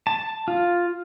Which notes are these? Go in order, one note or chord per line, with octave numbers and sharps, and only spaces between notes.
A5
F4